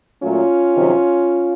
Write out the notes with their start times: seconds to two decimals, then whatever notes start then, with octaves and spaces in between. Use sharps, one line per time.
0.22 A#2 F#3 A3 C#4 F4
0.74 F2 C3 D#3 F#3